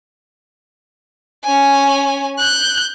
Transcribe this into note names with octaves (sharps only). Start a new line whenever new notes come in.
C#4 G#5
F#6 G6